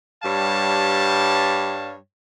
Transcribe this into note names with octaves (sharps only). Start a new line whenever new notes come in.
G2 G3 C#5 F5 A5